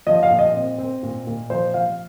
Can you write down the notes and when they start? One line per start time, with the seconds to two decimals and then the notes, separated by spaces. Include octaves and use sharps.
0.07 F3 D#5
0.23 F5
0.30 A#2
0.39 D#5
0.55 C4
0.78 C4
1.03 A#2
1.27 A#2
1.50 F3 C5
1.74 F3 F5